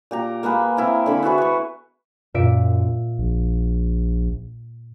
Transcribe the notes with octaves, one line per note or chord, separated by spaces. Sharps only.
A#2 G4 A#5
A#3 B3 G#4 B4
C4 E4 A#4
D3 C4 B5
B3 E4 F#4 G#4
B4 C#6
F#2 A#2 E5 D7
A#1